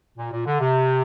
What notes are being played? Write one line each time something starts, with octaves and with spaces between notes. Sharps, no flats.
A#2
A#2
D3
C3